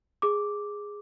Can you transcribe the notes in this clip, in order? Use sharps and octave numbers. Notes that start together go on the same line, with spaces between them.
G#4 D6